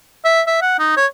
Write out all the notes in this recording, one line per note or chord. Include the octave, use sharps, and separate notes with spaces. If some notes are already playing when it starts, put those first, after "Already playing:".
E5
E5
F#5
D#4
C#5